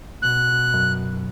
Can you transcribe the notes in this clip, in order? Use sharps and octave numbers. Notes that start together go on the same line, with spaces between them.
B2 F#6
F#2